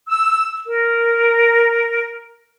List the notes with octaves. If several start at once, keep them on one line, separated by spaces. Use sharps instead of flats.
E6
A#4